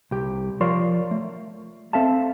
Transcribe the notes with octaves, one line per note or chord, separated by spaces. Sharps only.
C2 G4
F3 F4 A#4 C#5 D5 C6
A3
C4 A4 E5 F5 A5